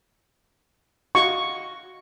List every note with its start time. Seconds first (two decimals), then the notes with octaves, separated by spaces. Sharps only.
1.15 F#4 D#5 F5 C#6